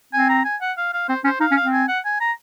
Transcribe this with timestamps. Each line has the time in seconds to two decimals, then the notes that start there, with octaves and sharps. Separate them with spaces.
0.13 C4 G#5
0.29 A#5
0.45 G#5
0.61 F#5
0.77 F5
0.93 F5
1.09 C4 C5
1.24 C#4 C5
1.40 D#4 F5
1.51 C#4
1.56 F5
1.62 C4
1.73 G#5
1.88 F#5
2.05 G#5
2.21 A#5